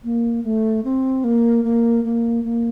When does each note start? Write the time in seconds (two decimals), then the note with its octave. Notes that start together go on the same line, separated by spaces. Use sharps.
0.04 A#3
0.44 A3
0.84 C4
1.24 A#3
1.64 A#3
2.04 A#3
2.44 A#3